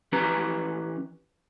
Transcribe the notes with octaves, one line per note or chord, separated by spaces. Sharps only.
E3 C#4 G4 B4 A#5